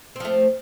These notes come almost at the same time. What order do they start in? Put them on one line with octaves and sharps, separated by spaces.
C4 F3 A3